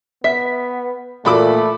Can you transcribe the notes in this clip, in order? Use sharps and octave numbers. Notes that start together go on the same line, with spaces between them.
B3 E5 B6
A#2 E3 A3 F4 F#4 A4 B5 D6